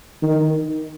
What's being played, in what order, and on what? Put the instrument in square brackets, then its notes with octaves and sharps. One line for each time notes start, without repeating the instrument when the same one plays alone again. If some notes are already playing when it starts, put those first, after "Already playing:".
[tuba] D#3